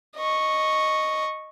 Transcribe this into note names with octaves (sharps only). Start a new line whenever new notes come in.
D#5 C#6